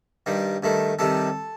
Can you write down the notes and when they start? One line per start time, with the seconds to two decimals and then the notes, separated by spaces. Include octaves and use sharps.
0.26 G2 D#3 G3
0.63 G2 D#3 A3
0.99 C3 D#3 G3 A4